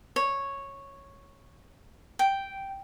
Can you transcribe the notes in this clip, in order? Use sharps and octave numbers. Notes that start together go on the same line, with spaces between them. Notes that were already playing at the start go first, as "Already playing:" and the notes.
C#5
G5